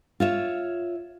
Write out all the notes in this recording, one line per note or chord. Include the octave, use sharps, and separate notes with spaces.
F4 C#5 E5